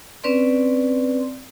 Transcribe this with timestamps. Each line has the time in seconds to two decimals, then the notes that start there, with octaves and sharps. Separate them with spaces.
0.24 C4 C#4 B4 D5 C6